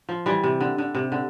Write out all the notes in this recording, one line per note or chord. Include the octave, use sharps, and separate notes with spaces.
F3
E3 G3
C3
D3
D3
C3
D3